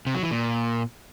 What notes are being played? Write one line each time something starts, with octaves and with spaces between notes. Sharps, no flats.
C3
F#3
E3
A#2